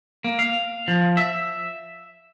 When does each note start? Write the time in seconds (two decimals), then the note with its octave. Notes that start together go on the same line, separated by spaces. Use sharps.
0.24 A#3
0.39 F5
0.88 F3
1.17 E5